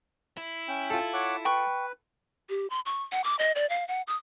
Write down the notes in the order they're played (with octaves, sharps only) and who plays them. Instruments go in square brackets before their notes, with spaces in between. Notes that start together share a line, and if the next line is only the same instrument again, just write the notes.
[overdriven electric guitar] E4
[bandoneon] C#4 G5
[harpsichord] F4 A4
[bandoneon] C#5 F#5 D6
[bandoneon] B4 [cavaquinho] G5 B5 C#6
[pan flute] G4
C6
C#6
F#5
D6
D#5
D5
F5
F#5
D#6